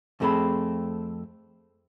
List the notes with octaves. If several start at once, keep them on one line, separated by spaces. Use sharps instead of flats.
F2 D#3 A3 C4 G#4 B5